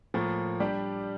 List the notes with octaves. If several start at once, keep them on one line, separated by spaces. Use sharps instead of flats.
A2 F3 A#3
G3 D4 G4